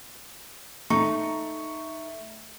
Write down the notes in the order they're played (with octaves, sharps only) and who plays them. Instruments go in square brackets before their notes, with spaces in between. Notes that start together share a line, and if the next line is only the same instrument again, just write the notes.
[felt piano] A3 C#7 [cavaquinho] D#4 [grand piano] C#6